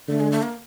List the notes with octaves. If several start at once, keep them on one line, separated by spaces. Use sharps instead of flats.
D3 A3
G#3
A3
A#3